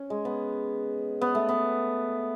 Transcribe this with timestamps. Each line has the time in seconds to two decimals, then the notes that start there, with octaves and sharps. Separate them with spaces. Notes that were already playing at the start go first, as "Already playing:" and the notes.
Already playing: C#4
0.10 G#3
0.25 B3
1.21 B3
1.35 A3
1.49 B3